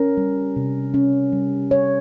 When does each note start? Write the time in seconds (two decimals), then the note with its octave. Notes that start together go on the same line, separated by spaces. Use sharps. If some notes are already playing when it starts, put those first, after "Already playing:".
Already playing: C#4 A#4
0.17 G3
0.56 C3
0.94 C#4
1.33 G3
1.71 C#5